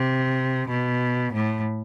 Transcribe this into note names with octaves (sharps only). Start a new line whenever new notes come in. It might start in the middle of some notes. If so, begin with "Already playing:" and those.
Already playing: C3
B2
A2